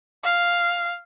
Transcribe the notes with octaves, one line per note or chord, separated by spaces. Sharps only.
F5